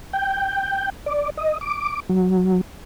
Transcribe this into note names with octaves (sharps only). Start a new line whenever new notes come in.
G5
D5
D#5
D6
F#3